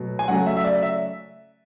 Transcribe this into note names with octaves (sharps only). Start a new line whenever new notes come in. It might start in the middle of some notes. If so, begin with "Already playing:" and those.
Already playing: B2 F#3 A3
G#5
C#3 F#3 A3 F#5
E5
E5
D5
E5